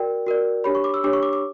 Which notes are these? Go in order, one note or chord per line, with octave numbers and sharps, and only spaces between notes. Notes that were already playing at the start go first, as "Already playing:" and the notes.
Already playing: F#4 A#4 D5 G5
F#4 A#4 D5
D4 G4 C#5 B5
C#6
D6
E6
D4 G4 C#5 D6
C#6
D6
D6